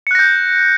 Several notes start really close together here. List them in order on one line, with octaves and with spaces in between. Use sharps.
C#7 F#6 A#6 G6